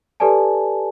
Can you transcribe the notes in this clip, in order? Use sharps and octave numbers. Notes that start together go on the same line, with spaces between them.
G4 A4 B4 D5 G#5 A5